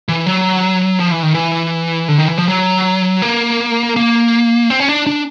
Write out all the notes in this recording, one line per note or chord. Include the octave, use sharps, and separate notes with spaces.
E3
F#3
F3
E3
D#3
E3
D3
D#3
E3
F3
F#3
A#3
A#3
C4
C#4
D4
D4